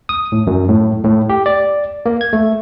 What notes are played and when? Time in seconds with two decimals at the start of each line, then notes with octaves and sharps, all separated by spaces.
0.09 D#6
0.32 A2
0.47 F#2
0.68 A2
1.05 A2
1.30 G4
1.46 D5
2.06 A#3
2.21 G#6
2.33 A3